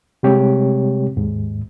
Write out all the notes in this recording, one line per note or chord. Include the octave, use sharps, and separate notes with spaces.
C3 G3 G#3 C4 G4 C#5
D#2 G#2